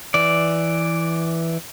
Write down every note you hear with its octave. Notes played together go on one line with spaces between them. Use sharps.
E3 D5